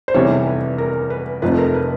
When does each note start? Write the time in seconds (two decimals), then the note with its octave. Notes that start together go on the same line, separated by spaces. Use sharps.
0.08 C5
0.14 F1 E2 C3 E3 G3 C#5
0.46 B4
0.78 A#4
1.10 B4
1.42 F1 F2 C3 F3 A3 B4
1.58 A#4
1.74 B4